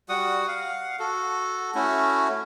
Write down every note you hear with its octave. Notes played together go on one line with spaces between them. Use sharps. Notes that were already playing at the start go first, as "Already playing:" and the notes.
G3 F#4 F#5 D#6
F5 F#5
F#4 A4
A3 C#4 E4 F#4